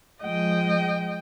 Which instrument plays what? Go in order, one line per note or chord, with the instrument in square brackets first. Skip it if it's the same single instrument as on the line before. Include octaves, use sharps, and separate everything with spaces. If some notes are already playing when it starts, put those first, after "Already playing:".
[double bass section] F3 G#3 [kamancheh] D#5 G5